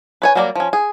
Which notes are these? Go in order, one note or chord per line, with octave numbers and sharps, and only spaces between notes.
B4 C#5 G#5
F#3 G3 A#3 G#4 D5
F3 C#4
G#4